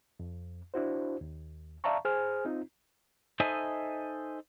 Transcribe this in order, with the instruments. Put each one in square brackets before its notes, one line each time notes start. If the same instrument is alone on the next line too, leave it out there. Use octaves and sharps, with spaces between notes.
[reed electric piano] F2
D4 E4 F#4 C5
D#2
D5 E5 F5 A5 A#5 C#6
G#4 C5 G#5 F6
C4 D#4 F4
[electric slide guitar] D#4 A4 C5 D#5 E5 G#5